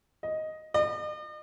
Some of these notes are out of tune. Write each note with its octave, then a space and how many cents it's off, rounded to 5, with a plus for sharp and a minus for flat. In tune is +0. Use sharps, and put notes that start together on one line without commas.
D#5 +5
D#5 -45